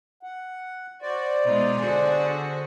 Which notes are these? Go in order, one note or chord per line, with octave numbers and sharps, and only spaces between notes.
F#5
F#4 C5 D5
B2 G#3 D#4 F4
D3 F#4 G#4